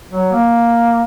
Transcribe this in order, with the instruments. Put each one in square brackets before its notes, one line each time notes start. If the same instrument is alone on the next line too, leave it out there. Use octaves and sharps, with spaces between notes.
[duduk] F#3
A#3